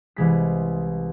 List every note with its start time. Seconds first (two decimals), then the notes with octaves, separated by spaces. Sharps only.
0.16 C2 E3 G#3 B6